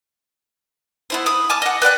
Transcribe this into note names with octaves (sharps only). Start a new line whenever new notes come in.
B3 E4 C5
B5 D#6
G#5 A5 D6 F6
D#5 F#5
B4 D5 G5 F#6